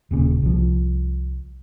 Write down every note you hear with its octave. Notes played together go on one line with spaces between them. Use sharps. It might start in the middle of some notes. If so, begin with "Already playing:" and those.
D#1 A#2 C#3
C2 F3